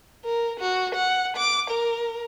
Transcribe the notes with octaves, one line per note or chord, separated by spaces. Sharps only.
A#4
F#4
F#5
D6
A#4